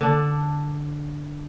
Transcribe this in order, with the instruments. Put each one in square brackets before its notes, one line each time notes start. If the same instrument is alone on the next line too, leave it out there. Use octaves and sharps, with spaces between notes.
[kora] D3 D4